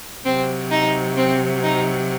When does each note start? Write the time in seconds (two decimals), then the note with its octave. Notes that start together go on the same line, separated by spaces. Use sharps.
0.25 C3 F#3 C4
0.70 D#4
1.16 C4
1.63 D#4